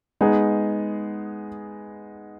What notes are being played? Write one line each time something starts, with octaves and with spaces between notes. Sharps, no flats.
G#3 B3 D#4 G#4